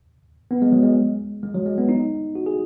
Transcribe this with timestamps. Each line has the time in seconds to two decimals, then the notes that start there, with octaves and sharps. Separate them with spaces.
0.51 B3
0.62 G#3
0.72 F#3
0.83 G#3
1.43 G#3
1.54 F#3
1.66 G#3
1.78 B3
1.89 D#4
2.35 F#4
2.46 G#4